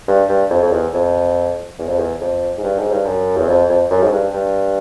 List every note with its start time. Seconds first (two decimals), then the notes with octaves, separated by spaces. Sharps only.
0.08 G2
0.29 G2
0.50 F2
0.63 F2
0.72 E2
0.94 F2
1.79 E2
1.88 F2
1.99 E2
2.21 F2
2.58 G#2
2.64 G2
2.79 G#2
2.92 G2
3.06 F#2
3.37 E2
3.48 F2
3.69 F2
3.90 F#2
4.03 G#2
4.12 G2
4.34 G2